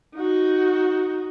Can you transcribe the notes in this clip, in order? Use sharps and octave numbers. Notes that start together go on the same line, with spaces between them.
D#4 F#4